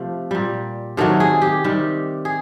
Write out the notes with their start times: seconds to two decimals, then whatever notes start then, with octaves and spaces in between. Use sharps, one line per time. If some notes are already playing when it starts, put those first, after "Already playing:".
Already playing: C3 F3 A3
0.31 A#2 G3
0.97 C3 D#3 F#3 A3 A4
1.20 G#4
1.42 G4
1.64 C3 D#3 G3
2.25 G#4